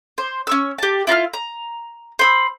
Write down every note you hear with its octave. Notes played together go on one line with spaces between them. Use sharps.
C5
C#4 C#6 E6
G4 A5
E4 F4 A#5 F6
A#5
C5 B5 E6